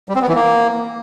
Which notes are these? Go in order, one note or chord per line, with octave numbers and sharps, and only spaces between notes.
G3
C4
B3
E3
A#3